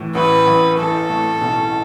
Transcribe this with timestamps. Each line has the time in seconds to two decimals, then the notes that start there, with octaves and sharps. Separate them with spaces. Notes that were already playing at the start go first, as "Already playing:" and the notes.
Already playing: A2 E3
0.15 A1 B4
0.46 A1
0.77 E3 A4
1.09 A2
1.41 B1